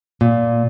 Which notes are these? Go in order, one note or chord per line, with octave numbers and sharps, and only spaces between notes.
A#2